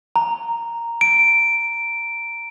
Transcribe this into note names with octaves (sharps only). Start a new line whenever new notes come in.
A#5
D7